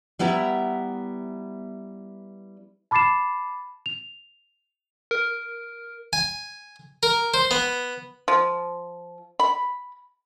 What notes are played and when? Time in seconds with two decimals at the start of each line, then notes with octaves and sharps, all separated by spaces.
0.19 G3 B3 E4 E5 A#5
2.91 A5 B5 D6 A6 C7 E7
3.86 F7
5.11 A#4
6.13 G#5
7.03 A#4
7.34 C5
7.51 B3
8.28 F3
9.40 B5